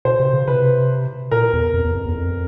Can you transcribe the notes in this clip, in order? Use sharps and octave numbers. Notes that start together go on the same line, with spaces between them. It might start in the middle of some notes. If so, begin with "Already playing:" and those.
B2 C5
C3
C#3
C3 B4
A#2 A#4
E2
F2
E2
F2
E2
F2